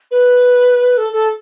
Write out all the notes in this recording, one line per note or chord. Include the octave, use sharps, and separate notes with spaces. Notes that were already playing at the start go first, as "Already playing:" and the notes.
B4
A4
A4